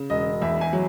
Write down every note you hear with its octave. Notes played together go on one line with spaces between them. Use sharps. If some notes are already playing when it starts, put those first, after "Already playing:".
Already playing: C#3
E1 D#5
E2 E5
G#5
F#3